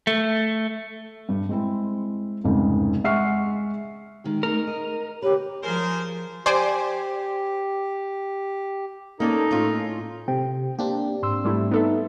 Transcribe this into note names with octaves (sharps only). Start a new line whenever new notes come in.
A3
G2
G#3 C4 E4
F1 C2 G#2 C#3
G#3 E5 F#5 C#6 F6 C7
D#3 G#3 G4
A3 D#4 G#4 A#4
D#5
D3 G4 B4 C#5
F3 G#4 A#4 C5
G4 C5 D5 G#5
A#3 C#4 D#4 A4 D5
A2 C#4 F4
C3 G5
A#3 C4 D4 G4
G#2 C6 E6
G3 A3 E4
B3 D#4 A4 E5